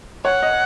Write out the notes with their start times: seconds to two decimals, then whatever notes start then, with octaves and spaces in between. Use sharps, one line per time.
0.25 C#5 F#5
0.42 D#5